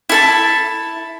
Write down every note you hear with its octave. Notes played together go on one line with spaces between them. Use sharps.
E4 A4 A5